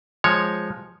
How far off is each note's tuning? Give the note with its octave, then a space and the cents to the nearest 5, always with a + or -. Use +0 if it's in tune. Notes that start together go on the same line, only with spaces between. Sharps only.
F3 +0 G#3 +0 C#5 +0